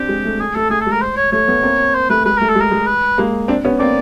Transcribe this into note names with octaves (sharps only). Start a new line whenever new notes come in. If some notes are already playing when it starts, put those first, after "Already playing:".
Already playing: C4 D4 G4
G#3
A3
A3 G#4
A3 A4
A3 G#4
A4
G#3 A#4
C5
C#5
A3 C#5
A3 B3
A#3 C4
C5
A3 B4
G#3 B4
A3 A#4
A4
G#3
A#4
G#3
B4
G#3 A#3
C4 D4
B3 C#4
A#3 C4 D5